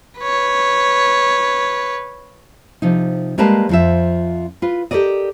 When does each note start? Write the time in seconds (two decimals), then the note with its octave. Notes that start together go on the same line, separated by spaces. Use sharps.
0.21 B4 C#5
2.82 C3 F3 D#4
3.38 G3 G#3 A#3 A#4 B4 A5
3.69 F2 F3 E5
4.62 F4 B4
4.91 G4 A4 A#4 D5 D#5